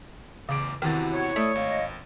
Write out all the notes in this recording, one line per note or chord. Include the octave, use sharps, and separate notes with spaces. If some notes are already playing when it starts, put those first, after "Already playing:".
A1 E2 C#3 D6 D7
E2 C3 D#3 E4 F#4 A6
C#5
A3 E4 A4 D5 D#6
G#1 D#5 F5